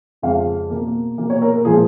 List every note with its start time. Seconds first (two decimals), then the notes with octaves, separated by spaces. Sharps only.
0.22 F2 C#3 G#3 F5
0.70 B2 A#3
1.18 B2 A#3
1.30 C#5
1.42 A#4
1.54 A#4
1.65 A#2 F3 G#3 G#4